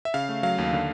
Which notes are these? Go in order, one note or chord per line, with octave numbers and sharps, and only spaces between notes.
E5
C#3 F5
A3
F#3 F5
D#2
D3